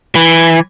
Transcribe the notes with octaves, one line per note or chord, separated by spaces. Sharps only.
E3